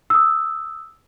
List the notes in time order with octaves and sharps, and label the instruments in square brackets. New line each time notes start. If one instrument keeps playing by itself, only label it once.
[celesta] D#6 E6